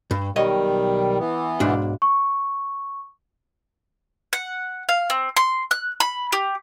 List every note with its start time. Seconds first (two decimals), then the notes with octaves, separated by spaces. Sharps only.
0.11 G2
0.36 B1 D#3 G3 C#5 D#5
1.19 E3 B3
1.60 B1 G#2 D4
2.02 C#6
4.33 F#5
4.89 F5
5.10 C4
5.36 C6
5.71 F#6
6.00 B5
6.32 G4